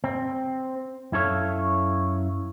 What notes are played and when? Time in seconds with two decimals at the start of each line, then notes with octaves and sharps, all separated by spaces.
0.04 C4
1.12 F#2 E4 A4 C#5 F5